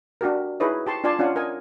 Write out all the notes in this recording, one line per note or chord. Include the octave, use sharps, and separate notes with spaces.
D4 F#4 G4 A#4
D#4 E4 G#4 B4 C#5 D#5
G4 A5 C6 C#6
D4 F4 D5 G#5 A5 C6
C#4 D4 F4 F5 F#5 G#5
A#4 D#5 G#5